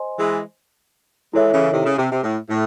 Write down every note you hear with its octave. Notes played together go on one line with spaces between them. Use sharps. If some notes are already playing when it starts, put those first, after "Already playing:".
Already playing: C5 D#5 G#5 C6
E3 G#3
E3 G#3 E4 A4 C#5 E5
C#3 E3
C3 D#3
C#3
C3
C3
A2
A2